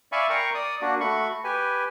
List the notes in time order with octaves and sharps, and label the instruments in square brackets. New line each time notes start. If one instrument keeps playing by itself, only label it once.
[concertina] D5 E5 F5 G#5 B5 C#6
A#4 G5 A#5 C6 C#6
D5 D#6
A#3 D4 F#4
A3 F#4 B5 C#6
G4 B4 G#5